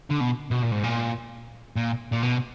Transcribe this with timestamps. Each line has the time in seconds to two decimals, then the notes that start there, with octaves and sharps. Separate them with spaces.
0.10 D3
0.20 B2
0.51 B2
0.63 A#2
0.72 G#2
0.84 A#2
1.76 A#2
2.12 A#2
2.23 B2